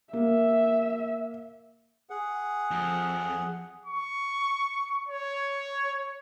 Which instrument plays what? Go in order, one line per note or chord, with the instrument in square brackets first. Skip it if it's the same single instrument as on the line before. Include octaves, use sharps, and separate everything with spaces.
[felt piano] A#3 [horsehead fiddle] E5
[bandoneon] G#4 F#5
[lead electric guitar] F2
[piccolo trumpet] C#6
C#5